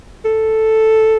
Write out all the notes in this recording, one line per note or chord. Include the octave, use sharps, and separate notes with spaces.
A4